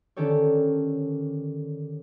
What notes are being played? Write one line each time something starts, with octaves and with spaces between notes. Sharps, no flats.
D3 D#3 C#4 G4 A4 C#5